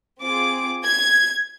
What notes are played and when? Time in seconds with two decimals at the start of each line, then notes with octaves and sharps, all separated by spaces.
0.22 C4 F4 G#4 D6
0.85 G#6